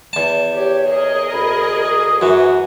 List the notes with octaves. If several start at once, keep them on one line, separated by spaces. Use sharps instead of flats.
E2 A5
G4 C#5
G#4 A#4 D#5
D2 B5
D#6
F#2 E3 F#4 B4